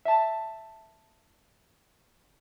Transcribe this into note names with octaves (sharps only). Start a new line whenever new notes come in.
E5 A5